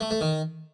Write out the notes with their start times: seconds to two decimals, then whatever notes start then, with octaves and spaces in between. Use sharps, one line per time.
0.01 A3
0.11 A3
0.21 D#3